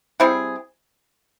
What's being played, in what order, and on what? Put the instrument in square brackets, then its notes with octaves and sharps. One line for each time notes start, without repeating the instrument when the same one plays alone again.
[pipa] G3 C4 E4 G#4